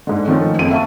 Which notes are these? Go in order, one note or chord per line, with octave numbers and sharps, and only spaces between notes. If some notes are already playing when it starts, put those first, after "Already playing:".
G#2 D3
D#3 F3 A3 C#4
F#1 F2 D#7
E5 F5 A5 C#6